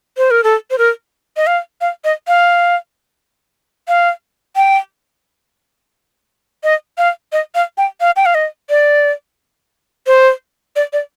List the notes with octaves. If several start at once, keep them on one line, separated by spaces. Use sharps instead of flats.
C5
A#4
A4
C5
A#4
D#5
F5
F5
D#5
F5
F5
G5
D#5
F5
D#5
F5
G5
F5
G5
F5
D#5
D5
C5
D5
D5